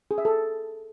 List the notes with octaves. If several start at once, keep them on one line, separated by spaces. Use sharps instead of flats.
G#4
E5
A4